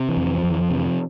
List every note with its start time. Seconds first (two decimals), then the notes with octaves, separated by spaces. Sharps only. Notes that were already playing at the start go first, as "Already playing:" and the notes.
Already playing: C3
0.09 E3
0.17 F2
0.27 E3
0.38 F3
0.44 F2
0.51 E3
0.61 F3
0.70 C3 E3
0.86 F3